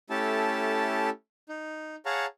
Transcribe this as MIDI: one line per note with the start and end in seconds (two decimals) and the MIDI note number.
0.10 1.10 57
0.10 1.10 61
0.10 1.10 64
0.10 1.10 67
0.10 1.10 69
0.10 1.10 81
1.49 1.96 63
2.06 2.26 68
2.06 2.26 73
2.06 2.26 77
2.06 2.26 78
2.06 2.26 81
2.06 2.26 82